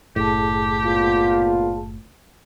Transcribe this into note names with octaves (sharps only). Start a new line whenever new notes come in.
F#1 A2 G4 G#4 A5
A#2 B3 F4